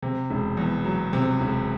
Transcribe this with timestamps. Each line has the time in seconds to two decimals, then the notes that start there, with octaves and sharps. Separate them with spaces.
0.02 C3
0.30 E1
0.57 E2
0.84 F#3
1.13 C3
1.41 E1